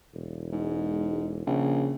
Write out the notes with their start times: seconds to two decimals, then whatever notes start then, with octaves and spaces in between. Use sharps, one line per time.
0.14 E1
0.52 G#2
1.47 A#1 C#3